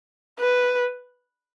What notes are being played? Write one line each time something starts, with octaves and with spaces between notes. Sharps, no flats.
B4